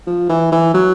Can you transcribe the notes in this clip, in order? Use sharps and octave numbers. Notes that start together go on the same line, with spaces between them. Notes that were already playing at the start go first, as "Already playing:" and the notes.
F3
E3
E3
F#3